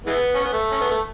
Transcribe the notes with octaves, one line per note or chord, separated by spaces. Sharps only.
E3 G#3 B3
C#4
B3
A3
C#4
B3
A3